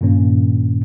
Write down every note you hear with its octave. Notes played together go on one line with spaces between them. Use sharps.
G2 A#2 D#3 A#3 C#4